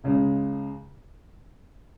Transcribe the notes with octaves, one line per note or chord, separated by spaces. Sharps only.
C#2 C#3 G#3